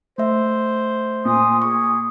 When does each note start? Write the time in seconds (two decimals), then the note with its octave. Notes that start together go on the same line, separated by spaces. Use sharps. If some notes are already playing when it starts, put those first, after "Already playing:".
0.18 A3 C5 E5
1.25 A#2 G#5 C6 D#6
1.62 G#4 C#6